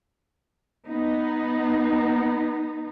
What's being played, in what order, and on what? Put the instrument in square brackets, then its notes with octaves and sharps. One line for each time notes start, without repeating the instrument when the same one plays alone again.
[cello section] B3 D#4